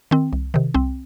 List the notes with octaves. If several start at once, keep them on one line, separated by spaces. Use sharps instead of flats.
D#3 C4
C2
C3 D#3
C2 C4